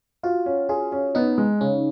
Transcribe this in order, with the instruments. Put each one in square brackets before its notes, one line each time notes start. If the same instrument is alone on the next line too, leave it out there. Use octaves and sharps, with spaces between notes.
[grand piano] F4 [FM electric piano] F#4
[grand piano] C#4
[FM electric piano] F4 [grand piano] G#4
[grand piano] C#4
[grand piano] B3 [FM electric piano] D#4
[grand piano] G#3
[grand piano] C#3 [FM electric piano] C#4